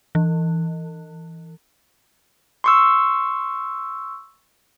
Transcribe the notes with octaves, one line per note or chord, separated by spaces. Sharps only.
E3
C6 C#6 E6